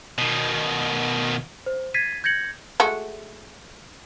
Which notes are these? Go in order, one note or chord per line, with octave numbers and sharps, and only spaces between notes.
B2 D#3
C5
G#6 A6 B6 C7 D#7
G6 G#6 A#6 C#7 F#7
G#3 A3 F#4